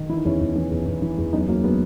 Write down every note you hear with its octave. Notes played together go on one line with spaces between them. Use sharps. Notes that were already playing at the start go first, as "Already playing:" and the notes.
Already playing: D#3
E3 E4
D#4
E2 C#4 E4
E2
E3
E2
E2
E3
E2
F#2 B3 D#4
F#3 A#3
F#3 G#3 B3